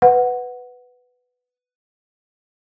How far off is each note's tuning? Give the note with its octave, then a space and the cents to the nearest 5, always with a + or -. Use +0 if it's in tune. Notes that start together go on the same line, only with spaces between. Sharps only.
B4 +10 F#5 +0